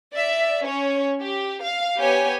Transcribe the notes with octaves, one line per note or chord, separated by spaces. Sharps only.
D5 E5
C#4 C#5
G4
F5
B3 G4 C#5 G#5